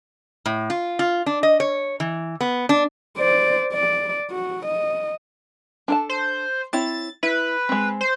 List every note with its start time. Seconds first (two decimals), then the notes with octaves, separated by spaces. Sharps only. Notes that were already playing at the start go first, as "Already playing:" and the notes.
0.46 A2
0.70 F4
0.99 F4
1.26 D4
1.43 D#5
1.60 C#5
2.00 E3
2.41 B3
2.69 D4
3.17 C5 D5
3.73 D5
4.31 F#4
4.66 D#5
5.88 D4 A4 A5
6.09 C5
6.73 C4 E4 C#5 A6
7.23 E4 B4
7.69 G#3 C4
8.01 C5